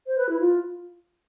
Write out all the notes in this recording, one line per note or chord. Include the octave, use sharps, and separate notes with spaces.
C5
B4
E4
F4